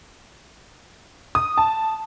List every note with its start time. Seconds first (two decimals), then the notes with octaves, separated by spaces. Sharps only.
1.35 D#6
1.58 A5